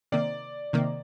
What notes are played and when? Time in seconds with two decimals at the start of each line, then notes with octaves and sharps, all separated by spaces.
0.12 C3 D#3 A#3 D5
0.73 C3 D#3 A#3